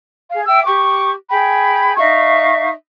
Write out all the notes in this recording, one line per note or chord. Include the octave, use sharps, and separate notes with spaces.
G#4 F5
E5 G5 E6
G4 C#6 D6
G#4 G5 B5
D#4 E5 F5 C#6